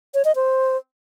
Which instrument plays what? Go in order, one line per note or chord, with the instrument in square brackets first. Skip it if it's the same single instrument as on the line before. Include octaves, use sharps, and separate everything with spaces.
[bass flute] C#5
D#5
C5